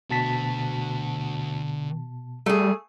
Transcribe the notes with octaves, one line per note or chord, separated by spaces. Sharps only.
B2 D3 F#4 A5 B6
G3 A3 G#4